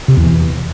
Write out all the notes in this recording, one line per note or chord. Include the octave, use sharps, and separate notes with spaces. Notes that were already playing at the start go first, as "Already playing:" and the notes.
C3
E2
E3